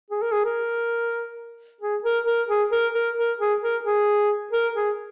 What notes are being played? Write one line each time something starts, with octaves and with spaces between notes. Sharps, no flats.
G#4
A#4
G#4
A#4
G#4
A#4
A#4
G#4
A#4
A#4
A#4
G#4
A#4
G#4
A#4
G#4